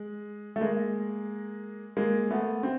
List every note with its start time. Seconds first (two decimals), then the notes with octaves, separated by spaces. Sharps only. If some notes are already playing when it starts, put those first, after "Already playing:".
Already playing: G#3
0.56 A3
0.61 G#3 A#3
1.97 G#3 A#3
2.30 A3 B3
2.63 C4